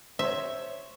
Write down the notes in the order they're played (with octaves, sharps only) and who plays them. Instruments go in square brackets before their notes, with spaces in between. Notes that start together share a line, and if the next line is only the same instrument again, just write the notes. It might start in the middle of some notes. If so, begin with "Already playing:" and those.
[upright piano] C5 C#5 [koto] E5